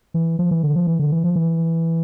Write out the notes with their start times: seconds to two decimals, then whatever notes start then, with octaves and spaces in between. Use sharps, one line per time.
0.14 E3
0.39 F3
0.51 E3
0.63 D3
0.76 F3
0.87 E3
0.99 D3
1.12 E3
1.24 F3
1.36 E3